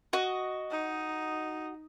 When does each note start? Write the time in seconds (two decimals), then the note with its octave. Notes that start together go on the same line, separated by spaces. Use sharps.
0.13 F#4 D#5
0.71 D#4